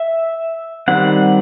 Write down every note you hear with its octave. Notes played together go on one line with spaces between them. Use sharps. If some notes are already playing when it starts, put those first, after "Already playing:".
Already playing: E5
D#3 G3 C4 F#5